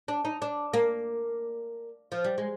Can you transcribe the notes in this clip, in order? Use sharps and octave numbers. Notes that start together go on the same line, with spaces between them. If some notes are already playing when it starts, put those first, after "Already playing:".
D4
D#4
D4
A#3
F3
G3
G#3